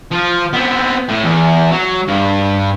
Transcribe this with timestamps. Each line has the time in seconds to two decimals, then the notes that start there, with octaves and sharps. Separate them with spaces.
0.12 F3
0.54 B3 C4
1.09 A2
1.24 E2
1.72 F#3
2.08 G2